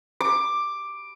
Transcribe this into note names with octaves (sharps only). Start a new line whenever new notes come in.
D6